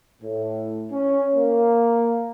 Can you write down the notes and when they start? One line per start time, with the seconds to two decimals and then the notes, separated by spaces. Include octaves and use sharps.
0.23 A2
0.92 C#4
1.36 A#3